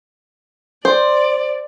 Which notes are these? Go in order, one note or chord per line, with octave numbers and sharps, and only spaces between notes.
C5 D5